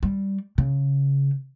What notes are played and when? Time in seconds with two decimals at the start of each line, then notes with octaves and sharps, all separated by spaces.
0.03 G3
0.58 C#3